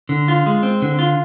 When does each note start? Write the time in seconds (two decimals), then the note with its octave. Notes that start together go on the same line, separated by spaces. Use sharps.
0.09 D3
0.28 F4
0.46 G#3
0.63 C4
0.82 D3
0.99 F4